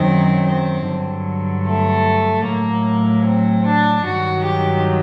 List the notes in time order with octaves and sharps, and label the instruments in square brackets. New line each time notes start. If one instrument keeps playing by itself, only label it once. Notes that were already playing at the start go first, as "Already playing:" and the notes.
Already playing: [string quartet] F#2 D#3 F#3 C4
C4
G2 D3 F#3
A3
A2 F#3 A#3
C4
D4
G2 D#3 F#3 F#4
G4